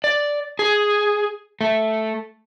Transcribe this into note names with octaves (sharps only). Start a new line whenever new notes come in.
D5
G#4
A3